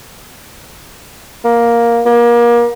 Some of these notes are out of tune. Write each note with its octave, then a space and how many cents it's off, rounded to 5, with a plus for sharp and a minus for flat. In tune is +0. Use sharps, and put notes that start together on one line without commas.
A#3 +10
A#3 +30